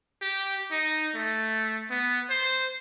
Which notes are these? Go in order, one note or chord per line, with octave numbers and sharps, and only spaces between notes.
G4
D#4
A3
B3
C5